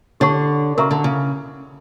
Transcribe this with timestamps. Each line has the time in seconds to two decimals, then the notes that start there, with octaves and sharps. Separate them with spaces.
0.20 D3 G4 C#5 F#5 C#6
0.77 C#3 F#4 A#4 E5 A#5 C#6
0.91 D3
1.04 C#3